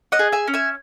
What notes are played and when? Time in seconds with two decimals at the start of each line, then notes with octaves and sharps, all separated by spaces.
0.12 D#5 F#5
0.19 G#4
0.32 E5 G#5
0.48 C#4
0.54 E5 G#5